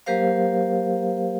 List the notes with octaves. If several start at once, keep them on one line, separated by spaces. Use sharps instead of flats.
F#3 A#3 G4 A#4 C5 F5